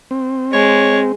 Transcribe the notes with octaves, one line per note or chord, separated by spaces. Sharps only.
C4
G#3 C#5